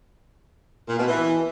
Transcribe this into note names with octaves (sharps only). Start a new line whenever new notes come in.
A#2
B2
E3